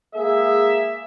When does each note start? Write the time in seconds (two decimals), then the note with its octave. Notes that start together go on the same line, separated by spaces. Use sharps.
0.15 G#3 A#3 G#4 E5